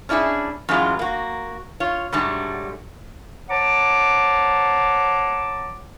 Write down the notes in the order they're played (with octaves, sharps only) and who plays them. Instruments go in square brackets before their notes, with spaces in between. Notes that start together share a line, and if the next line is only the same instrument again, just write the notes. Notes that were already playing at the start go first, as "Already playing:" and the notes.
[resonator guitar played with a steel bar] C#4 D4 E4 F#4 G#4
F#2 A2 E3 F#3 G#3 F4
A#3 F#4
F4 C#5
G#2 D3 F#3 G3 A3
[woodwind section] C5 C#5 F#5 A5 A#5 D6